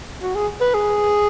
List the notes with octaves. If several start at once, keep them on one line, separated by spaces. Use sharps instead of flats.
F#4
G#4
B4
G#4